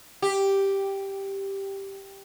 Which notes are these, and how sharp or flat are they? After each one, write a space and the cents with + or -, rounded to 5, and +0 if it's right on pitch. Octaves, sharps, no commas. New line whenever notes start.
G4 +0